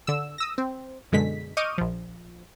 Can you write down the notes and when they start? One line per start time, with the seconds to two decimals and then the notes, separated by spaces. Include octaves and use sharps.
0.07 D3 E6
0.38 D#6 E6 A#6
0.58 C4
1.12 F#2 B2 D3 G#3 B6
1.57 D#5 C#6 D6 F6 G6 D#7
1.78 A#1 F3